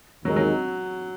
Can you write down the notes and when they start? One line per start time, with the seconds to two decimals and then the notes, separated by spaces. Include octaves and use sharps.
0.25 D#2 D#3 F#3 G#3 D#4 A#4
0.36 F#3